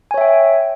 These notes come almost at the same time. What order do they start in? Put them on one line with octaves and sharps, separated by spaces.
G#5 C#5 E5 G5